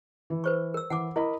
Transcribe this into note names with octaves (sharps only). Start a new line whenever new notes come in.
E3
B4 C5 C#6
A#4 E6
E3 F#5 G#5 D6
E4 A#4 D#5 B5